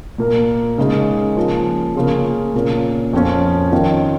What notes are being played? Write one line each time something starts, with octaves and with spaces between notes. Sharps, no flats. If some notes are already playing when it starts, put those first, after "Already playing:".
A#2 A#3 F4 A#4
C#3 G#3 D#4 G#4
F3 A#3 C#4
C#3 A#3 C#4 F4 G#4
A#2 A#3 C#4
F2 F3 C#4 F4
D#3 C#4 F4